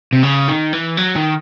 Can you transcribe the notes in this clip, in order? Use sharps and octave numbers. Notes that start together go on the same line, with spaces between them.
C3
C#3
D#3
E3
F#3
D#3